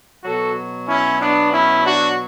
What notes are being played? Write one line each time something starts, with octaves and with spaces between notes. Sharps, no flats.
B2 F#3 F#4 A4
C#4 E4
B3 D4
C#4 E4
D4 F#4